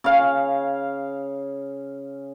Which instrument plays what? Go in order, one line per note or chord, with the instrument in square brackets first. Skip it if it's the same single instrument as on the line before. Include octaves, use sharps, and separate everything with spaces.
[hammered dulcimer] C#3 F5